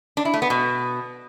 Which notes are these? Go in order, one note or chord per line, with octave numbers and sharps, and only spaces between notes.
D4
E4
A3
B3
B2